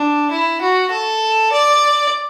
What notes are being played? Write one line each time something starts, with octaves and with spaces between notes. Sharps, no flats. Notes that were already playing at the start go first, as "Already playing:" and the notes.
Already playing: D4
E4
F#4
A4
D5